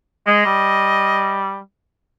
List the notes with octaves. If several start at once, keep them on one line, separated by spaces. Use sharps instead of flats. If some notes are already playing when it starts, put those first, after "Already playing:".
G#3 D#5
G3